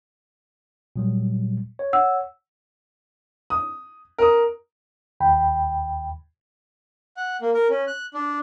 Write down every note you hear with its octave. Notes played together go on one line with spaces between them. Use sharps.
A#2 F#3 G3
C#5
F#5 E6
D#6
A#4 D#6
D#2 G5 B5
F#5
A#3
A#4
C#4
F#6
D4